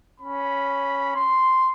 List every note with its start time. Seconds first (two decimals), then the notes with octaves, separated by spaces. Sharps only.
0.19 C#4 B5
1.15 C6